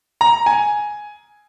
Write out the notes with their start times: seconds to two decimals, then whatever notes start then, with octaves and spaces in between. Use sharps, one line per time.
0.21 A#5
0.46 G#5